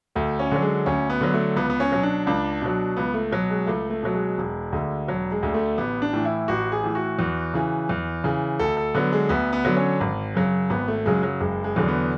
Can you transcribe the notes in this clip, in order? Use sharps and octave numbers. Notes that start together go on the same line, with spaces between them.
D2 A3
C#4
D3 F#3
G#3
D2 C#4
B3
D3 F#3
A3
C#2 B3
B3
C#4
B2 F#3
D4
C#2 D4
B2 F#3
C#2 B3
A3
B2 F#3
G#3
C#2 A3
A3
B2 F#3
G#3
E1
D2 D3
E1 F#3
G#3
D2 D3
A3
A1 B3
D4
A2 E3
E4
A1 F#4
G#4
A2 E3
F#4
E2
C#3 E3
E2
C#3 E3
D2 A4
A4
D3 F#3 B3
G#3
D2 B3
B3
D3 F#3
C#4
G#1
F#2 C#3 F#3
G#1 B3
A3
F#2 C#3 F#3 G#3
F#3
F#1 G#3
G#3
E2 D3 F#3
B3